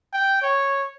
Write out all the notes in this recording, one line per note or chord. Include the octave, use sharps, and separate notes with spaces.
G5
C#5